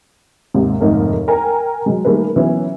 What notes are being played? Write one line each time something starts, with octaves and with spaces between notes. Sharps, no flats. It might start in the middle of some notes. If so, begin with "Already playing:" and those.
D#2 G#2 C3
F1 D#2 G#2 A3 D#4 A#4
A#4 G5 G#5 A#5
F#3 G#3
D#3 G3 A3 A#3 G#4 B4
E3 F#3 B3 C#4